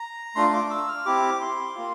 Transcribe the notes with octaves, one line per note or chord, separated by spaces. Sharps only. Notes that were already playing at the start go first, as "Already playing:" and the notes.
Already playing: A#5
A3 D4 F4 C6
D6
E6
F6
C4 E4 G4 D6
C6
A#3 F4